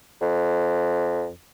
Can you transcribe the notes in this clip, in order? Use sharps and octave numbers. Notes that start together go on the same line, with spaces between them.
F2